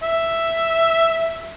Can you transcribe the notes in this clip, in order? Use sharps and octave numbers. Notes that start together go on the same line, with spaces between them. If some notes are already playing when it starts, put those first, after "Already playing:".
E5